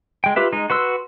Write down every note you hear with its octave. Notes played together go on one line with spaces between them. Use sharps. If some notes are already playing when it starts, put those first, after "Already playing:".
G#3 G5
F4 G4 B4 E5
G#3 D#4
F#4 B4 C6 E6